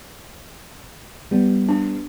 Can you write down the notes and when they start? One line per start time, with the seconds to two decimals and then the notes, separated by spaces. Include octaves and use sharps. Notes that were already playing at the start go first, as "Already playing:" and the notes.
1.31 G3 B3
1.69 D4